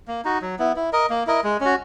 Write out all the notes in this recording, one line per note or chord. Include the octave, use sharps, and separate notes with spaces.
A#3
D#4 F#4
F#3
B3 E4
E4
A#4 D#5
A#3
E4 A#4 D#5
G#3
C#4
F#4